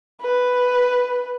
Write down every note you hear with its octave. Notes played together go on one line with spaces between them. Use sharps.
B4